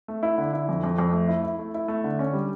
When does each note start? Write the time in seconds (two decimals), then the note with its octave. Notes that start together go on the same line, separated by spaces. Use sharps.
0.08 A3
0.23 E4
0.38 D3
0.53 E4
0.69 F2
0.84 F2
0.98 F2
1.13 A3
1.28 E4
1.43 E4
1.59 A3
1.74 E4
1.88 A3
2.04 D3
2.19 C#4
2.33 G3